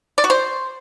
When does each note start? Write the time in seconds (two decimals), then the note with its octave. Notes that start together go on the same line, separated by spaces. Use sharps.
0.18 D5
0.24 F#4
0.30 C5